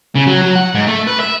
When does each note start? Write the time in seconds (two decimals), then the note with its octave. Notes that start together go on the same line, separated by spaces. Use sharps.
0.15 C#3
0.27 F#3
0.42 F#3
0.55 F#5
0.75 G#2
0.87 A3
1.07 B4
1.20 E5